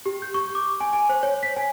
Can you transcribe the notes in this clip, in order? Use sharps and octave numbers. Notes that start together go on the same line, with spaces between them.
G4
G6
C#6
D6
G#5
G#5
C5
C#5
B6
G#5